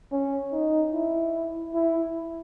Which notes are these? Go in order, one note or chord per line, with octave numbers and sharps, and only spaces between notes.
C#4
D#4
E4
E4